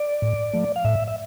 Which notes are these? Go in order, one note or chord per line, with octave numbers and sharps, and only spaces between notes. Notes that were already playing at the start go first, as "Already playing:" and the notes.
Already playing: D5
A2
F3 A3
F5
A2 E5
E5